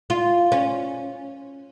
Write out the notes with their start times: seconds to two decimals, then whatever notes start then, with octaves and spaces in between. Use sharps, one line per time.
0.10 F4
0.52 C#4